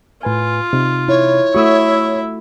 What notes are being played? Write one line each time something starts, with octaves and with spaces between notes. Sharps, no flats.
A2 F4 B4 G#5
C3 D#4
E4 C#5
A3 E4 F#4 E5 C#6 D#6 E6